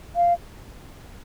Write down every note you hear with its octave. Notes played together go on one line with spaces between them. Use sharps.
F5